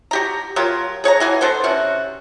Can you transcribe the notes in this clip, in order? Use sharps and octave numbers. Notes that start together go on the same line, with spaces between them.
F#4 G4 A#5
F#3 F4 G4 A#4
G#4 C#5 F#5 A#5
E3 F#4 G#5
B3 D4 A4 C5
C3 C#4 F#4